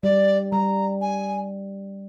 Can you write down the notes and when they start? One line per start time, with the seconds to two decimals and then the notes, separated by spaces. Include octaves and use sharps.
0.03 G3 D5
0.52 G3 A#5
1.01 G#5